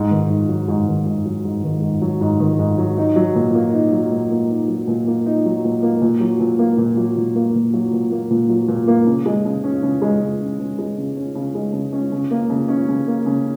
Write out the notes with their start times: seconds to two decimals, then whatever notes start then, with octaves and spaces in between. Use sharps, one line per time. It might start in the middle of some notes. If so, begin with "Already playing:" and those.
Already playing: G#2
0.11 D#3
0.30 G#2
0.49 F#3
0.68 G#2
0.87 D#3
1.06 G#2
1.25 F#3
1.45 G#2
1.63 D#3
1.82 G#2
2.02 F#3
2.21 G#2
2.40 D#3
2.59 G#2
2.78 F#3
2.98 D#4
3.16 F#3
3.35 A#2
3.55 A#3
3.73 D#4
3.92 F#3
4.12 A#2
4.31 A#3
4.50 D#4
4.68 F#3
4.88 A#2
5.07 A#3
5.26 D#4
5.45 F#3
5.64 A#2
5.83 A#3
6.02 A#2
6.21 F#3
6.40 A#2
6.59 A#3
6.78 A#2
6.97 F#3
7.17 A#2
7.35 A#3
7.55 A#2
7.74 F#3
7.92 A#2
8.12 A#3
8.30 A#2
8.49 F#3
8.68 A#2
8.88 A#3
9.07 C#3
9.26 G#3
9.45 C#3
9.64 C#4
9.83 C#3
10.02 G#3
10.21 C#3
10.40 C#4
10.59 C#3
10.78 G#3
10.98 C#3
11.17 C#4
11.35 C#3
11.55 G#3
11.73 C#3
11.93 C#4
12.12 C#3
12.31 A#3
12.50 C#3
12.68 C#4
12.89 C#3
13.07 A#3
13.26 C#3